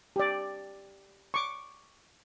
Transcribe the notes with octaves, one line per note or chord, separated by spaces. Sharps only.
G4 D5
C#6 D6